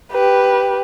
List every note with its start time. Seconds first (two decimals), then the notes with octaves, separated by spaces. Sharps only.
0.12 G4 B4